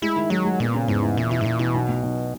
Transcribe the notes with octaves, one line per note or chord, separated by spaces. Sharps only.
G#3 E4
D#3
F#3 G#3
G#3
A#2 B3
C#3
E2 G#2
E3
A#2 E3
B2 E4
G#2
A#2 E3
B2 E3
B1
B1
B1